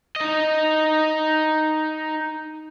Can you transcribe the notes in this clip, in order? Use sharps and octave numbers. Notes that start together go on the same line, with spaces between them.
D#4 D#5